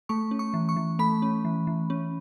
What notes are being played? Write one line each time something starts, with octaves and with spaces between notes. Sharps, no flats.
A3 C#6
C#4
C#6
E3
C#6
E3
A3 B5
C#4
E3
E3
C#4